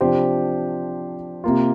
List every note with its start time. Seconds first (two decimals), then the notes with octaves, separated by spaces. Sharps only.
0.01 C3 F3 D4 G4 C5
1.44 C3 A#3 F4